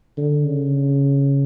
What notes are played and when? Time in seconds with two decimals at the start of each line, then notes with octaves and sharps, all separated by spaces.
0.17 D3
0.45 C#3